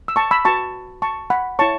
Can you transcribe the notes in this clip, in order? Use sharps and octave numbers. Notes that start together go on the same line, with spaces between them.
E6
A5 C#6
B5 E6
F#4 B4 A5 C#6
A5 C#6
F#5 B5
E4 C#5 A5 C#6